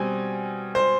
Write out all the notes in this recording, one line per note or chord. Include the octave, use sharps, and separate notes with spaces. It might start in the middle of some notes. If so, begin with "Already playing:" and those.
Already playing: B2 G3 C4 G#5
C5